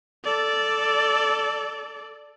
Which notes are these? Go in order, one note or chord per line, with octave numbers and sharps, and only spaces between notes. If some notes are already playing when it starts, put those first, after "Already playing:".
A4 D5